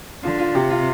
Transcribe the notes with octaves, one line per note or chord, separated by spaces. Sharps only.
D3 F4
F4
C3 G4
F4